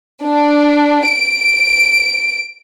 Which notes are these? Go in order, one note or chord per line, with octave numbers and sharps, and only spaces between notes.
D4
D7